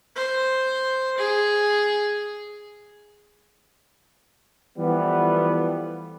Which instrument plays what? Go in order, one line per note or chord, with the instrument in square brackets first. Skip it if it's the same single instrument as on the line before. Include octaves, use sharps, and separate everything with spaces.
[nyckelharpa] C5
G#4
[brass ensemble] E3 F3 G3 A3 B3